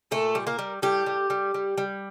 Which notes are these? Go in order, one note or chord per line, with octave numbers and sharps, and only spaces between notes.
A#2 A3 A4
G3
A#3 A#4
G3
A2 G3 G4
G3
G3
G3
G3